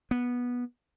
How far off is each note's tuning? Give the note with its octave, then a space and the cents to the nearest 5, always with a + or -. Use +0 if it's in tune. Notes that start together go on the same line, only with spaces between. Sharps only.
B3 -15